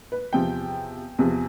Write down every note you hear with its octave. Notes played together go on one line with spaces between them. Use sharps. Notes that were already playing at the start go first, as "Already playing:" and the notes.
B4
E2 C3 F3 G5
E2 C3 F3